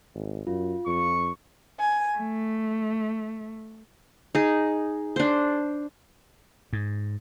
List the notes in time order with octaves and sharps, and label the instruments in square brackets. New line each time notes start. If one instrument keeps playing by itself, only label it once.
[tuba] G#1
[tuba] F#2 [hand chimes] F4
[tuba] F2 [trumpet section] C#6
[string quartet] G#5
A3
[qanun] D#4 G#4
D4 C5
[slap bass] G#2